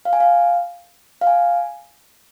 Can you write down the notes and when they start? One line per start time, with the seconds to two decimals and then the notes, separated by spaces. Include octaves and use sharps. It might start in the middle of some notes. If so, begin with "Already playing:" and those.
0.05 F5
0.13 G#5
0.20 F5
1.21 F5
1.27 G#5